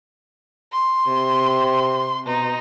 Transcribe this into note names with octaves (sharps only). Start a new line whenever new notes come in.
C6
C3
B2 D#4